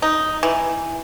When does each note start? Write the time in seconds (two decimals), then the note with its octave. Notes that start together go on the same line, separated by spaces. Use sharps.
0.02 D#4
0.43 E3